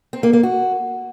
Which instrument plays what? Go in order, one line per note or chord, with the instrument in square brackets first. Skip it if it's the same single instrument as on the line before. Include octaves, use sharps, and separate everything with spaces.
[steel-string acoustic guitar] C4
A#3
A#3
F#4